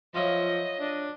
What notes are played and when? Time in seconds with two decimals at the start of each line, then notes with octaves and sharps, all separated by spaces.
0.14 F3 F#3 E4 F4 D#5
0.80 D4